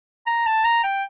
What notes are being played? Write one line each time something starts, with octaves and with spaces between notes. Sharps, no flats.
A#5
A5
A#5
G5